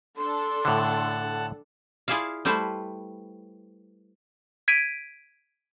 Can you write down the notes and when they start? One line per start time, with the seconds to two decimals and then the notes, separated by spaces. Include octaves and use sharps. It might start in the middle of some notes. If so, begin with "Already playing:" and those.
0.18 D4 A4 C6
0.65 A2 D3 F#5 A5
2.08 E4 F4 G#4 D5 E5 F5
2.45 G3 A3 E4 B4 C5
4.68 G#6 B6 D7 D#7